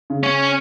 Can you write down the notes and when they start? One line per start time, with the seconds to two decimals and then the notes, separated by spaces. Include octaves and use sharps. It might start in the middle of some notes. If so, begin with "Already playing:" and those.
0.10 C#3
0.23 C#4